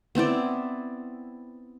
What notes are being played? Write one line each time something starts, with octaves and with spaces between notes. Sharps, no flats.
B3 C4 E4 D5